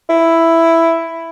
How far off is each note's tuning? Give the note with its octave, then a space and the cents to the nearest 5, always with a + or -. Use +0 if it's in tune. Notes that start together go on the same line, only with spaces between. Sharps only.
E4 +5